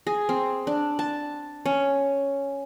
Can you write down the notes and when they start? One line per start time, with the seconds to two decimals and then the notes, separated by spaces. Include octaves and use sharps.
0.07 G#4
0.29 C4
0.67 D4
0.99 A5
1.66 C#4